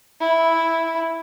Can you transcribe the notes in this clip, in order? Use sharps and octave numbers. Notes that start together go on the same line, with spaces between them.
E4